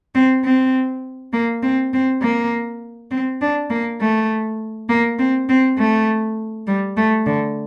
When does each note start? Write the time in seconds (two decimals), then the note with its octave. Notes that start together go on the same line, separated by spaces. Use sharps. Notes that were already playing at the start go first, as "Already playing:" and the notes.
0.15 C4
0.45 C4
1.33 A#3
1.63 C4
1.93 C4
2.22 A#3
3.11 C4
3.41 D4
3.70 A#3
4.01 A3
4.89 A#3
5.19 C4
5.49 C4
5.78 A3
6.67 G3
6.97 A3
7.27 D3